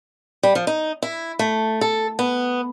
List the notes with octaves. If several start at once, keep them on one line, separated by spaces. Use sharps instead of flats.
G3
F3
D#4
E4
A3
A4
B3